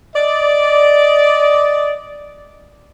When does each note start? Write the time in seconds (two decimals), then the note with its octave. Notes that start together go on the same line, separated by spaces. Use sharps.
0.15 D5 D#5